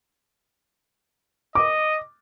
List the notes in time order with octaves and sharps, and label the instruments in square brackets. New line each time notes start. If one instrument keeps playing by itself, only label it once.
[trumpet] D#5 [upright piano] D6